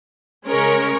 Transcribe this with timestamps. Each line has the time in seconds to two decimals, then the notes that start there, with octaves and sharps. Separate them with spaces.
0.48 C#3 G#3 C#4 A#4 C#5